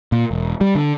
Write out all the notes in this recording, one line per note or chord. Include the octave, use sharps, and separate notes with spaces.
A#2
E1
G3
D3